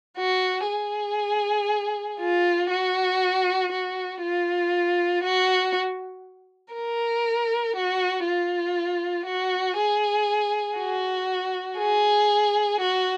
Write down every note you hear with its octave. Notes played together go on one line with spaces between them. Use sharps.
F#4
G#4
F4
F#4
F#4
F4
F#4
A#4
F#4
F4
F#4
G#4
F#4
G#4
F#4